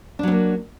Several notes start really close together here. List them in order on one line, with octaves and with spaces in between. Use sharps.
D4 F#3 C4 A#3